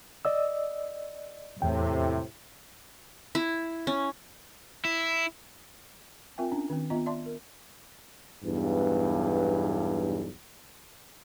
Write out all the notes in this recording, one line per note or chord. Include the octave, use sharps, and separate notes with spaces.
D5 D#5 E6
E2 A2 C3 G5
E4
C#4
E4
C4 F4 A#4 E5 G5 G#5
C#4 D4
D#3 C4
B3 F4 D#5 E5 A#5
D5 E5 A5 C6 D6
A#4
B1 E2 G2